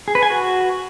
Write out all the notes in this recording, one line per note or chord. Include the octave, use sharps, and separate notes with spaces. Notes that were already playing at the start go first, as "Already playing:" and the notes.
G#4
B4
G#5
F#4